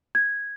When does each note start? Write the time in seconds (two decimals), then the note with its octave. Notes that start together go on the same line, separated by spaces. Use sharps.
0.15 G#6